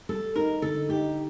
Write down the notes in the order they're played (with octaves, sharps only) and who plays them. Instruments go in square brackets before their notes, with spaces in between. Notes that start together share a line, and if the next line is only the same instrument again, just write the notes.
[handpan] G3 [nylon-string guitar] A4
[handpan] D#4 [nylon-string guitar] A#4
[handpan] D3 [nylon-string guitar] A4
[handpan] D#4 [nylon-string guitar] G4